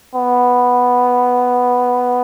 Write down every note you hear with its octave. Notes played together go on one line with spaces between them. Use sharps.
B3